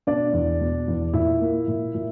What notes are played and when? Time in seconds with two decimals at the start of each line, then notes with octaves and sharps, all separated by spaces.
0.07 B2 D4 D5
0.33 E2
0.61 B2
0.87 E2
1.13 A#2 E4 E5
1.41 A#3
1.68 A#2
1.95 A#2